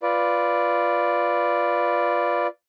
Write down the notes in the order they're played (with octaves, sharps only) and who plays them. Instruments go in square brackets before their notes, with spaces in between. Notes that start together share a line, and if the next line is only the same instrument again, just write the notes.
[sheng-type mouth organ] F4 B4 D5